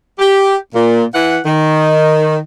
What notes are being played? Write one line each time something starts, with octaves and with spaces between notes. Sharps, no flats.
G4
A#2
E3 F#5
D#3